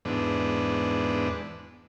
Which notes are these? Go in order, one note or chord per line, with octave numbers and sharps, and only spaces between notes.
E2 G#2 B3 D4